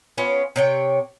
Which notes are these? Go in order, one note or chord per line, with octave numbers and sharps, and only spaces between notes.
B3 C#4 F4
C3 C#5 G5